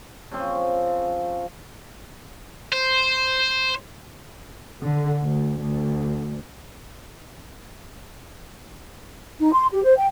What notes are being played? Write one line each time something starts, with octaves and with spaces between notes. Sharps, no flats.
C#3 F3 C4 D#5
C5
D3
D2
D2
D#4
C6
G4
C5
G5